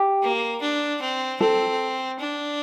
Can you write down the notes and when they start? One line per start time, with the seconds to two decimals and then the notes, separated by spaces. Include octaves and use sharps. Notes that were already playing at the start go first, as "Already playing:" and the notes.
Already playing: G4
0.22 A#3
0.61 D4
1.01 C4
1.40 C4 A4
2.19 D4